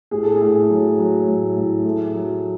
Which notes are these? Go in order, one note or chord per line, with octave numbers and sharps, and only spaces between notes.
A2 G#4
A4
A2 G#4
F#3
F#3
A2
A2
A3
F#3